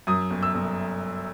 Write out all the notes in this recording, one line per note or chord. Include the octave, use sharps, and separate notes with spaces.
F#2 D#6
G1
E6
G1